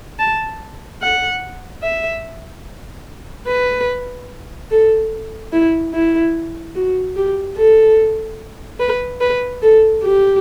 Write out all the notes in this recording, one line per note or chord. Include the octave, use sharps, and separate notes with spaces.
A5
F#5
E5
B4
A4
E4
E4
F#4
G4
A4
B4
B4
A4
G4